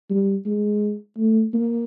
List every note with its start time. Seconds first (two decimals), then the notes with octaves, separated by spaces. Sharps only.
0.10 G3
0.45 G#3
1.17 A3
1.54 A#3